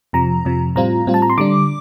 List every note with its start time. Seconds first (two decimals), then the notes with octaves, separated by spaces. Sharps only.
0.13 F2 C3 F3 A#5
0.45 F2 C3 F3
0.76 A2 G3 C4 F4 A#5
1.07 A2 G3 C4 F4
1.14 A5
1.22 A#5
1.30 C6
1.38 D3 G3 D4 D6